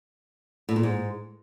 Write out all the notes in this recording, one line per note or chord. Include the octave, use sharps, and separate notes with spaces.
A2
A#2
G#2